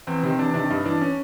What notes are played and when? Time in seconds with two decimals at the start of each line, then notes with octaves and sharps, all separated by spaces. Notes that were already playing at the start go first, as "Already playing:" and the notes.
0.07 E2 C4
0.23 C3 D#3 C4
0.39 E2 D4
0.54 C3 D#3 D4
0.70 G2 D#4
0.85 E3 D4
1.01 C#4